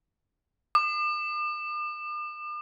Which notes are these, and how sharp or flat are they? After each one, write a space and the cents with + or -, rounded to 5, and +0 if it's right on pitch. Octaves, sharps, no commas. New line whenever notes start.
D6 +45